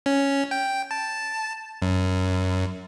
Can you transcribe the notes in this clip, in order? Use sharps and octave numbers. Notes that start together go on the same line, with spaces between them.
C#4
G5
A5
F#2